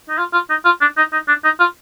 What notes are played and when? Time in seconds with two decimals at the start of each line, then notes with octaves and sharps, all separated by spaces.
0.09 D#4
0.18 F4
0.33 F4
0.50 D#4
0.65 F4
0.81 D4
0.97 D#4
1.13 D#4
1.28 D4
1.44 D#4
1.60 F4